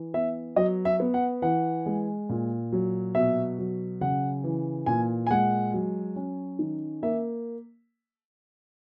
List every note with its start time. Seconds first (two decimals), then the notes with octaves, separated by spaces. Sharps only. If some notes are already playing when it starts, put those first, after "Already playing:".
Already playing: E3
0.14 B3 E5
0.56 F#3 D#5
0.85 E5
1.00 B3
1.14 F#5
1.42 E3 F#5
1.86 G#3
2.29 A#2
2.72 F#3
3.15 B2 E5
3.58 F#3
4.01 C#3 F#5
4.44 E3
4.86 A#2 G#5
5.27 G#5
5.31 G#3 F#5
5.74 F#3
6.16 C#4
6.59 D#3
7.03 A#3 E5